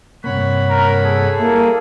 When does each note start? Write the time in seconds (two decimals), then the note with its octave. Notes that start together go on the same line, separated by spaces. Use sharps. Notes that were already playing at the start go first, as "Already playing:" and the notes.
0.24 G2 C3 A#3 C#5 F#5 B5
0.69 A#4
1.03 G#4 A4
1.39 G3 A#3 E4